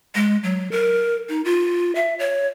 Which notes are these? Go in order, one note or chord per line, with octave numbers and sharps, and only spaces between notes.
G#3
F#3
A#4
D#4
F4
E5
C#5